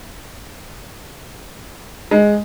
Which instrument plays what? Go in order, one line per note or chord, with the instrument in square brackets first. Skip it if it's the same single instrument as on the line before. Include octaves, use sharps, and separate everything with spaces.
[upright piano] G#3